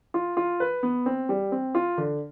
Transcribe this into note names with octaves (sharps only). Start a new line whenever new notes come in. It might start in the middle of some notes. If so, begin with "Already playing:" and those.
F4
F4
B4
B3
C4
G3
C4
F4
D3